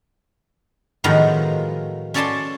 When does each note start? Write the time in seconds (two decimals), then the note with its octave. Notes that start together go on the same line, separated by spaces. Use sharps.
1.04 A2 D#3 F3 F#3 G#3 B3
2.14 C#4 A4 D5 G#5 A5 C6